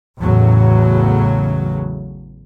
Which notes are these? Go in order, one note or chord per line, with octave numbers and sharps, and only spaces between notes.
A1 E2 A2 C#3 F#3